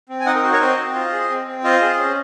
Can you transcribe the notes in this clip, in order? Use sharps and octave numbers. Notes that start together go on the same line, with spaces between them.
C4
G#5
D#4 D#5 F#5
A#4
F#4 C5
A#4 C#5
C4 C5 D#5
C4
F4
G#4
C4
C4
F4 C5 D#5
G#4
C#4